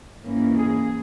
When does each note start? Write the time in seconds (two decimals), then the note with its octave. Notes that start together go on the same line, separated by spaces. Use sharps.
0.23 G#2 E3 A#3 C#4
0.55 G#4